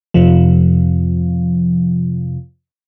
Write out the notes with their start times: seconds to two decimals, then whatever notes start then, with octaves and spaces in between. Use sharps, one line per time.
0.14 F2 C3 F3